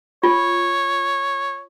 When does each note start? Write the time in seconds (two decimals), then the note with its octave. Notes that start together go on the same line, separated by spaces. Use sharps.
0.23 F4 C#5